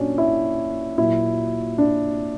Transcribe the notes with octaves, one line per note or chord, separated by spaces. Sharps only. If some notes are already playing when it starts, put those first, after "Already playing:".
Already playing: A#2 F#3 C#4 D4
E4
A#2 F#3 E4
D4